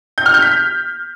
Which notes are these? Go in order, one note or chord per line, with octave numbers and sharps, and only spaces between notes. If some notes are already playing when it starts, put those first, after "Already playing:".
G6
F6
G6
B6